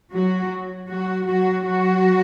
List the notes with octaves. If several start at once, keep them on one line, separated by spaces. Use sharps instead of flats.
F#3 F#4
F#3 F#4
F#3 F#4
F#3 F#4